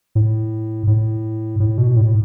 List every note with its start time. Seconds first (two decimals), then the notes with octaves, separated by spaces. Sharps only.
0.15 A2
0.87 A2
1.60 A2
1.78 B2
1.96 A2